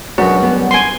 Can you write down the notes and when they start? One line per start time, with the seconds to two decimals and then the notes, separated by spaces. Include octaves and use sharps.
0.18 C#2 F#2 B2 D4 F#4
0.43 G3 B3
0.71 G#5 C6